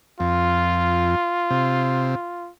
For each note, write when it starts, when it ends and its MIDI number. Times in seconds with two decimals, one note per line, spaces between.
0.20 1.15 41
0.20 2.50 65
1.51 2.15 48